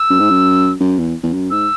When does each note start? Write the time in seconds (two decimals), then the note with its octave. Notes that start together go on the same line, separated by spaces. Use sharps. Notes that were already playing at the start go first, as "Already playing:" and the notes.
Already playing: E6
0.10 F#2
0.20 G#2
0.30 F#2
0.80 F#2
0.99 E2
1.23 E2
1.33 F#2
1.51 G#2 E6